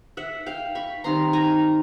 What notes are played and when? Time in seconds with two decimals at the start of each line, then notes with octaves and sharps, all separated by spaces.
0.17 E5 F#5
0.46 F5 G5
0.75 B5 C#6
1.04 D#3 G3 C4 D#4 A#5 C6
1.33 G#5 A#5